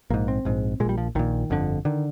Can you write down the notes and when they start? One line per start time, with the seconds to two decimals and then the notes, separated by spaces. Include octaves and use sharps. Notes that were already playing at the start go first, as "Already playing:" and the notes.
0.10 A#1 G#2 A#3
0.28 C4
0.45 A#1 G#2
0.80 A#2 G#3
0.85 A#1 G3
0.98 F3
1.15 A#1 A#2 D#3
1.50 G1 F2 D3
1.85 D3 D#3